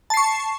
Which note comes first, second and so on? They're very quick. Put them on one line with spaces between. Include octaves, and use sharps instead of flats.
A5 C7 C#6